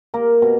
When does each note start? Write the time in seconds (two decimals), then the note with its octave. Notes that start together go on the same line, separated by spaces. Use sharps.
0.14 A#3 A#4
0.42 B2